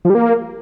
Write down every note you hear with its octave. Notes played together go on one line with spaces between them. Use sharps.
F3
G3
A#3